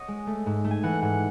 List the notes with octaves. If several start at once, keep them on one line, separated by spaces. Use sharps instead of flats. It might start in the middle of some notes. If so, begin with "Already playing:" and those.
Already playing: C#5 D#5 F#5
G#3
A3
G#2
A3
G#5
E3 F#5
G#2 F#5